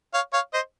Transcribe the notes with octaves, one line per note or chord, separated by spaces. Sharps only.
C#5 F5
C#5 F5
C5 D#5